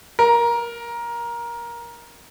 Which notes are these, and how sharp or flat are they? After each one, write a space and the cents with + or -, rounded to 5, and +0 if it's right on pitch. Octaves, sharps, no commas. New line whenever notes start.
A#4 +15